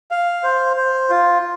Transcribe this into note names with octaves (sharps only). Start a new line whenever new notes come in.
F5
C5
C5
F4